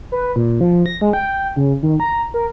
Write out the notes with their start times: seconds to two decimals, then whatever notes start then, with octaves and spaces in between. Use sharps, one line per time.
0.12 B4
0.36 A#2
0.61 F3
0.86 A#6
1.01 G#3
1.13 G5
1.56 C#3
1.83 D#3
2.00 A#5
2.34 A#4